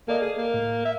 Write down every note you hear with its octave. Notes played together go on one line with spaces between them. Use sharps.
A#3 A4 D5 D#5
G#4
A#3
A2
E5